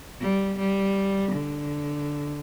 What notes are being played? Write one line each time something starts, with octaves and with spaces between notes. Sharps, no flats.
G3
G3
D3